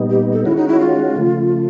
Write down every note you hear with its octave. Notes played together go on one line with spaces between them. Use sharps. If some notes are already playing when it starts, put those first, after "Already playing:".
Already playing: A#2 G3 B3 D#4
G4
A4
D#3 G#3 C#4 E4 F#4
D#4
E4
F4
C#3 F3 A3